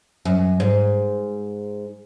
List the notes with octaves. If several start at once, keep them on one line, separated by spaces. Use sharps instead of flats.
F#2
G#2